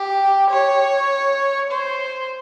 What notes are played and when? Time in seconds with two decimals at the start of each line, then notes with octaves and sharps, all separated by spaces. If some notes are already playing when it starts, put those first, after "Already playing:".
Already playing: G4
0.50 C#5
1.71 C5